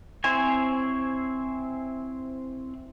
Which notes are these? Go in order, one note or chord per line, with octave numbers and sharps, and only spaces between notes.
C4 E4 C5 C#5 G#5